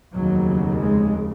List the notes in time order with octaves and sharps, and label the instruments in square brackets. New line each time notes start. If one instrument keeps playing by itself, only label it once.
[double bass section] F1 D#2 C#3 F#3
G#3